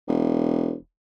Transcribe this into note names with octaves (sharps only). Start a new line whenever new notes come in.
E1